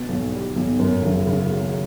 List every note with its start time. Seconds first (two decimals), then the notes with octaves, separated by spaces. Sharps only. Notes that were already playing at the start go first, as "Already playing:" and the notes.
Already playing: B2
0.09 B1
0.32 G3
0.56 B1
0.79 F#2
1.03 F#1
1.26 C#3
1.51 F#3